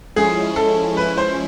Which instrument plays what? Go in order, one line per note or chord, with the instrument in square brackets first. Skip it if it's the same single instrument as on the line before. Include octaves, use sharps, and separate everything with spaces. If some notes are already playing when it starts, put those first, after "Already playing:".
[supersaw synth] F3 G#3 C#4 E4 [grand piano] G#4
[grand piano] A4
[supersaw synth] F3 G#3 C#4 E4 [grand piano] B4
[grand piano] C5